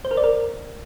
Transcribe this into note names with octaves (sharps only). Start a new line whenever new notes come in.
C5
A#4
D5
A#4